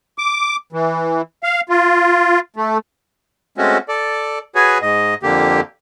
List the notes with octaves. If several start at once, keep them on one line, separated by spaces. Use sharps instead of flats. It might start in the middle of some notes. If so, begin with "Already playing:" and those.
D6
E3
F5
F4
A3
G#3 A3 C4 C#4 F#4
A4 D5
F#4 G#4 B4 C#5 G#5
G#2 D#5
F2 D3 A#3 G4